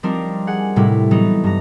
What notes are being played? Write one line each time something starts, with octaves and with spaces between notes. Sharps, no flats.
F3 G3 C4 D4 D#4 A#4
G#4 F#5
A2 C3 G3 E4
E3 F#3 B3 D#4
G2 A#5